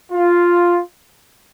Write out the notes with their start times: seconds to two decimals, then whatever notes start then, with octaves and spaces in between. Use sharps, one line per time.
0.12 F4